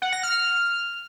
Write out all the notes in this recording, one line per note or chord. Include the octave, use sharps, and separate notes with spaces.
F#5
A#6
F6